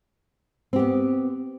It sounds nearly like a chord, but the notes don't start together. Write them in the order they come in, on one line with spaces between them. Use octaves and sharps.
C4 G4 B3